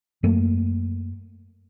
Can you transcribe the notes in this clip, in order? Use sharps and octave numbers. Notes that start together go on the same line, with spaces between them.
F#2 A3 A#3